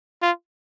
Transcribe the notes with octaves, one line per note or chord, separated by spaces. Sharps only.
F4